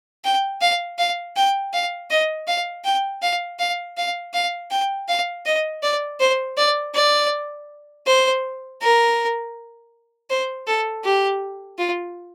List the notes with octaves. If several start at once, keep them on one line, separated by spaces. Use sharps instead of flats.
G5
F5
F5
G5
F5
D#5
F5
G5
F5
F5
F5
F5
G5
F5
D#5
D5
C5
D5
D5
C5
A#4
C5
A4
G4
F4